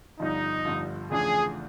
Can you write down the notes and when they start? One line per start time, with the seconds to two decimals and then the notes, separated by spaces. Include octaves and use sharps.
0.19 G1 G2 D3 F3 D#4
0.65 G1 G2 D3 F3
1.11 E2 C#3 F3 A3 D4 G#4